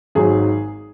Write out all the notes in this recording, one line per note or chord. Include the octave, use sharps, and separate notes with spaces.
G#1 G#2 F#3 G#4